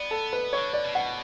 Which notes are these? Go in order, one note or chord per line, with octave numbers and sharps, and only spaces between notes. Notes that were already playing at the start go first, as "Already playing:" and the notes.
Already playing: B3 D5
A4
B4
D3 C#5
D5
B2
F#5